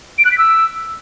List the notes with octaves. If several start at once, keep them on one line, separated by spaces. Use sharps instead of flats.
D7
F#6
B6
E6